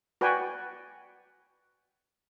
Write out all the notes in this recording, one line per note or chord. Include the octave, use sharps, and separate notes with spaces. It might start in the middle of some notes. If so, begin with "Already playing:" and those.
F#4 B4 D5 G5 G#5